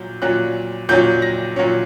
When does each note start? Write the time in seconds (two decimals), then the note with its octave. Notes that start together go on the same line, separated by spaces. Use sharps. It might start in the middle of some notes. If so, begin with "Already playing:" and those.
Already playing: A#2 F#3 G6
0.22 A#2 F#3 C#4 F#6
0.89 A#2 F#3 C#4 G6
1.22 A#6
1.56 A#2 F#3 C#4